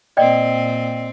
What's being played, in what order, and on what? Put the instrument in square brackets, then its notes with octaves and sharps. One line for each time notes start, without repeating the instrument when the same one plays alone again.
[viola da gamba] A#2 C4 [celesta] D5 D#5 G5